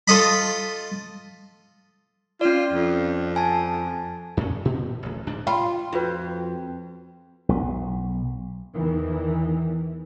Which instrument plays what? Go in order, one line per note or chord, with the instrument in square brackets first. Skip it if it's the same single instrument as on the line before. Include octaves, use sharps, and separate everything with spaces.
[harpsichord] F4 A4 D#5 B5
[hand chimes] C#4 D5 [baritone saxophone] F4
[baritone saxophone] F2
[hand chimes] G#5 A5
[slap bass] F2 A#2 C#3 C#4
A#2
D1 A1
D1 G#2 D4
[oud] F4 [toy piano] G5 B5
[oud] F2 [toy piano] F4 F#4 B4
[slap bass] B1
[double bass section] E2 D#3 E3